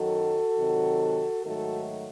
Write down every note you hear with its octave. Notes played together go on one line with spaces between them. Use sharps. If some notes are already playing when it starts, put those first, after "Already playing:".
Already playing: F#2 D#3 F#3 F#4 A4
C3 D#3 F#3
G#2 D#3 F#3 A3 F#4 A4